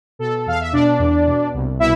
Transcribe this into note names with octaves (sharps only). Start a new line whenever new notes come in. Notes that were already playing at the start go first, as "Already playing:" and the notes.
B2 A4
E2 F5
E5
B2 D4 D5
E2
B2
C2
B2 E4 E5